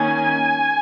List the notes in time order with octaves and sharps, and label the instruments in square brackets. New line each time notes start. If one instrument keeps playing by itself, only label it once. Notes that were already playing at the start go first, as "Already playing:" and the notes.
Already playing: [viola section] D#3 A#3 C#4 G#5